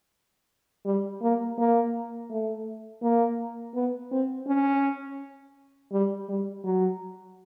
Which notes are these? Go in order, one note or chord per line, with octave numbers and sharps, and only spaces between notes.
G3
A#3
A#3
A3
A#3
B3
C4
C#4
G3
G3
F#3